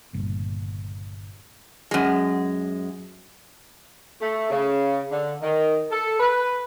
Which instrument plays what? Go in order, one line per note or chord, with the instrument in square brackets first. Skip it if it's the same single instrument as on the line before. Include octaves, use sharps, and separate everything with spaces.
[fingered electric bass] G1 C#2 A#2
[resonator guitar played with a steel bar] F#2 G#3
[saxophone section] A3
C#3
D3
D#3
A4
B4